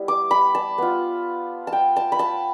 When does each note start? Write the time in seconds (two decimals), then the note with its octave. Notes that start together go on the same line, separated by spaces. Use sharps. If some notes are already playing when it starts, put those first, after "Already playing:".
Already playing: G3 B3 E4
0.08 D6
0.31 B5
0.55 A5
0.78 B3 F4
1.67 A5
1.73 G5
1.96 A5
2.12 B5
2.19 A5